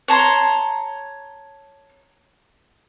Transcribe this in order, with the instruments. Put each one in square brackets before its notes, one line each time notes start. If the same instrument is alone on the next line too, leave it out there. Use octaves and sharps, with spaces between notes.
[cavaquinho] C#5 A5 A#5 C6